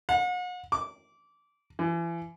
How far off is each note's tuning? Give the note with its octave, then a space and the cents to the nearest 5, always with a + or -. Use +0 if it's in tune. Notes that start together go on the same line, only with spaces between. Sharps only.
F#5 -40
D6 -20
E3 +35